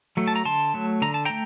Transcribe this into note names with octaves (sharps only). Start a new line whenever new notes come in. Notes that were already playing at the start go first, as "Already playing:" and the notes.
F#3 A3
A5
A#5
D3 A5 C6
F#3 A3
D3 A#5
A5
A3 G5 A#5